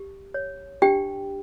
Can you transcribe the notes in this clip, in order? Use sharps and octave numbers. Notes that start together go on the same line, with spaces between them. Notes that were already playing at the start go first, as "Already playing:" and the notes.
Already playing: G4
C#5
D4 G4 G5